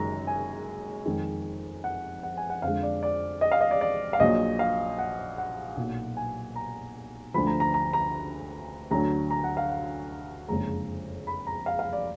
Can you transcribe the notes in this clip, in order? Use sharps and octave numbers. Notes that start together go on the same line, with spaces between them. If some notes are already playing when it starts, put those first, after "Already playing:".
Already playing: F#1 F#2 D#3 G#3 A#5
G#5
F2 D#3 G#3
F#5
F#5
G#5
F#5
F2 D3 G#3 F5
D5
D5
D#5
F5
D#5
D5
D5
F5
A#1 A#2 F#3 D#5
F5
F#5
F#5
B1 A#2 F#3
G#5
A#5
D2 D3 F3 B5
A#5
A#5
A#5
A#5
D2 D3 F#3 A#5
A#5
F#5
F5
F#5
F#1 F2 D3 G#3 A#5
B5
A#5
F5
F5
D5